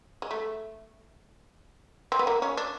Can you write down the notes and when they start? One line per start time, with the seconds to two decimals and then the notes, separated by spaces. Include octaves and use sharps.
0.22 G#3
0.31 A3
2.12 C4
2.19 B3
2.27 A#3
2.42 C#4
2.57 D4